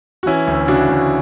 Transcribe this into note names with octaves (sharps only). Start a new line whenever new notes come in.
F#4
E3 C#4 E4
D2
C#3 D4 F#4
D2